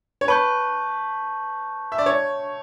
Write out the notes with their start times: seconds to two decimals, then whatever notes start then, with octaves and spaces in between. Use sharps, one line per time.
0.21 C#5
0.28 B4 A5 C#6 G6
1.92 E5
1.98 D5
2.06 C#5